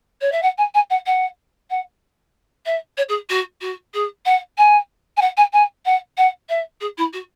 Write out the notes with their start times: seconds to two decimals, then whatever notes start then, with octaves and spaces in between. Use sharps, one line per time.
0.21 C#5
0.32 E5
0.42 F#5
0.57 G#5
0.74 G#5
0.90 F#5
1.06 F#5
1.70 F#5
2.65 E5
2.97 C#5
3.08 G#4
3.29 F#4
3.61 F#4
3.94 G#4
4.25 F#5
4.57 G#5
5.16 G#5
5.21 F#5
5.37 G#5
5.53 G#5
5.85 F#5
6.17 F#5
6.49 E5
6.80 G#4
6.97 E4
7.13 F#4